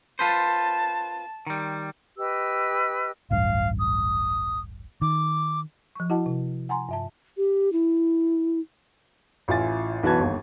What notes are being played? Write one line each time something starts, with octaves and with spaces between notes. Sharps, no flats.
F4 B4 C5 A5
D#3 G3
G4 B4 D#5 E6
D1 A1 G2 F5
D#6
D#3 D6
F3 C#6
E4 F#4 D#5 F#5 A5
C3
F#5 G#5 A#5 C6
G2 E5 A5
G4
E4
A1 E4 F4 G#5 A6
B1 E3 F#4 B4 A5 G#6
G1 D#2